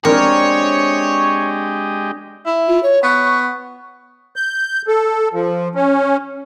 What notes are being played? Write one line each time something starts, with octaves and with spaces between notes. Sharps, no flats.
G#3 C4 D4 G4 A#4 C#5 D#5
E4
F4
C#5
B3 C#6
G6
A4
F3
C#4